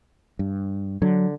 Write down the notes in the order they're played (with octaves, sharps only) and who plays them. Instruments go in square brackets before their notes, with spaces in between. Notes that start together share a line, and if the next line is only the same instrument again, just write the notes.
[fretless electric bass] G2
[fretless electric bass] D3 [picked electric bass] F#3